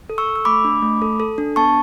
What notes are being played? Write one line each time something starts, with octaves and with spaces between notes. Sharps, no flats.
A4
C#6 E6
A4
E6
A3 B5 D6
D4
A3
A4
A4
D4
B3 A5 C#6